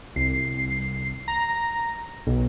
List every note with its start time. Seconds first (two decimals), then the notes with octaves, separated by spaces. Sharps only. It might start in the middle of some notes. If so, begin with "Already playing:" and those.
0.16 C2 C7
1.28 A#5
2.27 B1